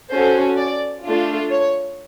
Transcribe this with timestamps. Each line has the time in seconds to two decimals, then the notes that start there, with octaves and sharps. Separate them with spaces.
0.10 C#4 F#4 A4 C5
0.57 D5
1.05 A3 D4 F4
1.51 C#5